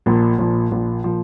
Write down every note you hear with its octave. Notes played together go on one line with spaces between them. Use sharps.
A#1 A#2 F3
A#1 A#2 F3
A#1 A#2 F3
A#2 F3